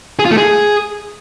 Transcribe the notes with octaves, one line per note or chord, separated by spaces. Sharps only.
G#4
F4
A3
G#4